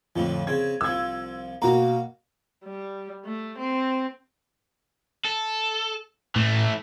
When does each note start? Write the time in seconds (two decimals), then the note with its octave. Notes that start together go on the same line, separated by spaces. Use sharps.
0.16 F2 A2 D3 F3
0.47 C#3 C4 G#6
0.81 C2 F3 E6 G#6
1.62 B2 A#3 F#4 F5 A#5
2.65 G3
3.25 A3
3.58 C4
5.25 A4
6.36 A2 E3 A3